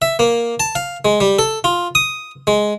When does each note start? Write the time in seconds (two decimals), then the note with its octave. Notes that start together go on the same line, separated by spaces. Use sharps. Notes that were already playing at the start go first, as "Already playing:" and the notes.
0.02 E5
0.19 A#3
0.60 A5
0.75 F5
1.05 G#3
1.20 G3
1.39 A4
1.64 F4
1.95 D#6
2.47 G#3